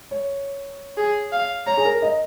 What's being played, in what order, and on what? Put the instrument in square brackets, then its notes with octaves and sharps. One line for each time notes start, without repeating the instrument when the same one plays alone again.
[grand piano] C#5
[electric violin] G#4
F5
[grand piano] C#5 [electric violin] A#5
[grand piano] G#4
A#4
D#5